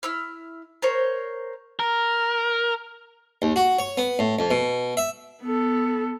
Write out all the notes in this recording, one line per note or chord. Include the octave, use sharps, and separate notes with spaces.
E4 E6 F6
A#4 C5 C#5
A#4
D#2
F#4
C#5
B3
A2
F2
B2
E5
B3 A4